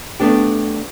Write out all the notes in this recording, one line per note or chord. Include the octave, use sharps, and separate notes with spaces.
A3 B3 D4 G4